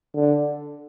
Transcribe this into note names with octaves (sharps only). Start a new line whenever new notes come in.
D3